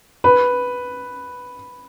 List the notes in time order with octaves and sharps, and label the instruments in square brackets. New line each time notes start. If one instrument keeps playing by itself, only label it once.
[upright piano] B4